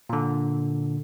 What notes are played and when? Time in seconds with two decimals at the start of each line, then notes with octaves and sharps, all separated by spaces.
0.09 A#2 D3